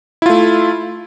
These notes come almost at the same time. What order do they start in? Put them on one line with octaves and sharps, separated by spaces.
E4 F4 A3